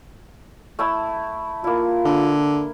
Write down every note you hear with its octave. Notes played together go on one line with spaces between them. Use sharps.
A3 E4 E6
A#3 E4 F4
D3